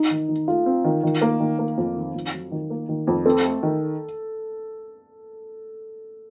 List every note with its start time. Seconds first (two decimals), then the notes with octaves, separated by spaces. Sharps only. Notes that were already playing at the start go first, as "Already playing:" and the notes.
Already playing: D#4
0.10 D#3
0.29 D#3
0.47 A3 F4
0.66 C4
0.84 D#3
1.03 D#3
1.21 A#3
1.40 D#3
1.59 A#3
1.77 F2
1.96 D#3
2.15 F2
2.33 F#3
2.51 D#3
2.70 A#3
2.89 D#3
3.07 F2
3.26 C4 A4
3.44 A3
3.63 D#3